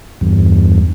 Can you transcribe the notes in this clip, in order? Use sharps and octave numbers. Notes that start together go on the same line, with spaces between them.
E2 G2